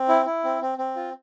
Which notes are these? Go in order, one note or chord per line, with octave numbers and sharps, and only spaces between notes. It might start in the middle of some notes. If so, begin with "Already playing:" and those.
Already playing: C4
E4
E4
C4
C4
C4
F4